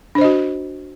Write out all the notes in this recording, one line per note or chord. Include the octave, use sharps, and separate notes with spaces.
D4 F#4 C5 D#5